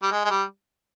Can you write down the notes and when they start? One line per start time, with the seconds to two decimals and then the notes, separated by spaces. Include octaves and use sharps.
0.03 G3
0.12 G#3
0.25 G#3
0.30 G3